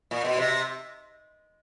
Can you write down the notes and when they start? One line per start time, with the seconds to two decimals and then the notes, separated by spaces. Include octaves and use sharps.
0.11 A#2
0.25 B2
0.38 C3